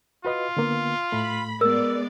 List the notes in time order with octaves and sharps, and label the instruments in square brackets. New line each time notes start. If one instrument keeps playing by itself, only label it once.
[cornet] F4 [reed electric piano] F#4 B4 D#5
[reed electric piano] D3 A#3 B3
[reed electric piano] A2 A3 [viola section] B5
[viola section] G#3 B3 D5 [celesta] A#4 E6